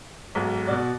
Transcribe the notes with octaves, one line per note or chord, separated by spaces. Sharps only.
B1 G#2
B2 F#4 D5